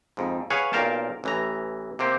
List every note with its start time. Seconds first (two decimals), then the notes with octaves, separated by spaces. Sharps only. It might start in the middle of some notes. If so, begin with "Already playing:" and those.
0.17 F2 G#2
0.50 G#4 B4 C#5 F5 F#5 G#5
0.73 B1 A#2 A#4 F5 G5 A5
1.24 A1 E3 A#5
1.99 C3 A#3 C4 G4